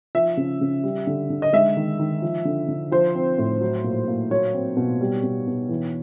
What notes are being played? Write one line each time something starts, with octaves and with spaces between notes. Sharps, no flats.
F3 E5
C#3
C#3
G3
D3
D3
D#5
G#3 E5
D#3
D#3
F3
D3
D3
F3 C5
C4
A2
F#3
A#2
A#2
F#3 C#5
C4
B2
G3
B2
B2
E3